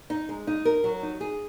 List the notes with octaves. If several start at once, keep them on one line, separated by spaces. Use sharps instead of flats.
D#4
G#3
D#4
A#4
F#3
D#4
G#4